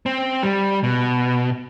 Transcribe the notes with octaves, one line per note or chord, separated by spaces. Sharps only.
C4
G3
B2